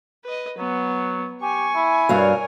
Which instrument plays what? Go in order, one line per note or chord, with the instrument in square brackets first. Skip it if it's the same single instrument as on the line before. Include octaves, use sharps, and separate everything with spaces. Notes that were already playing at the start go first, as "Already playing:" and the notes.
[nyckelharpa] B4 D#5
[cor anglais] F#3 [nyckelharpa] B3
[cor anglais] G4 [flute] G#5 [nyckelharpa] C#6
[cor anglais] E4
[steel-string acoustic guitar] G2 F#4 F5 [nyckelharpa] A#4 C#5